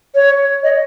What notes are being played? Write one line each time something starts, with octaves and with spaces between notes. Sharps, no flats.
C#5
D#5